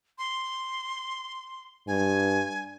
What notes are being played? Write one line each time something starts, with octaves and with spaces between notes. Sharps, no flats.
C6
G2 G#5